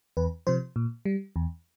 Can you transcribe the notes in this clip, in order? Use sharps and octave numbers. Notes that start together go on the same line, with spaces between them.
E2 B4
C3 F3 C5
A#2
G3
E2